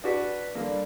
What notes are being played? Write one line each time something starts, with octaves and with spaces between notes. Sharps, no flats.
D4 F#4 B4
D3 G3 A#3